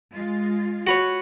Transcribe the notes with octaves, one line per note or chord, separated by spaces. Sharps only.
G#3 F4
F#4 B4 C#5